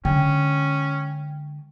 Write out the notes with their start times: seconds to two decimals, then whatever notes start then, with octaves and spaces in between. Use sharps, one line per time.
0.05 D3 G#3 C#4 G5